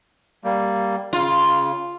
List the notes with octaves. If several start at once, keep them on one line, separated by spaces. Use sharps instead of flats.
G3 A#3
C#3 F4